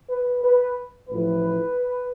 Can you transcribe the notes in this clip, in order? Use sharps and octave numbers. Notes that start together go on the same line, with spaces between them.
B4
B4
A1 A2 F3 B4